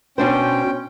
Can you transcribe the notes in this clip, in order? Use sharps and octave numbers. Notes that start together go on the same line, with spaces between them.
B2 C#4 D4 C5 G5